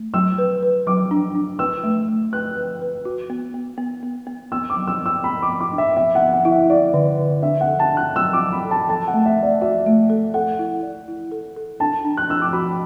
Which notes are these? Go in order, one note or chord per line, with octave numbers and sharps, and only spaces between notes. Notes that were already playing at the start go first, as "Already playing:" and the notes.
Already playing: A3
F#3 E6
B4
B4
F#3 D6
D4
D4
B4 E6
A3
A3
B4 F#6
B4
B4
F#4
B3
B3
B3
B3
B3
B3 E6
D6
F#3
E6
B3
E6
B3 B5
D6
B3
D6
D4
E5
B3 E5
F#5
B3
F#5
E4
E5
E4 D5
D3
D3
D4 E5
F#5
A4
A5
D4
F#6
F#3 E6
D6
F#3
B5
A4
A5
A4 A5
F#5
A3
E5
A3
D5
F#4 E5
A3
A4
A4 F#5
E4
D5
E4
A4
A4
D4 A5
D4
F#6
D4 E6
D6
F#4 B5